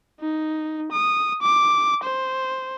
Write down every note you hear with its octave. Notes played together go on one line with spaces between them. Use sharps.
D#4
D#6
D6
C5